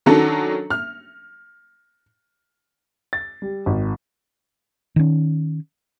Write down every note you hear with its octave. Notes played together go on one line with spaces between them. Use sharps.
D#3 F#3 C#4 D4 A4
F6
A6
G3
G#1
D#3 C#4